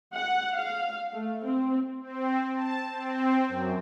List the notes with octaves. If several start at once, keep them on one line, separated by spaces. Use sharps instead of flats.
F#5
F5
A3
C4
C4
A5
C4
F#2